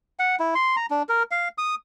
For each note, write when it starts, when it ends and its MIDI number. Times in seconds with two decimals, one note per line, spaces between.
0.19 0.36 78
0.40 0.54 64
0.55 0.76 84
0.76 0.86 82
0.91 1.02 62
1.09 1.23 70
1.31 1.48 77
1.58 1.75 87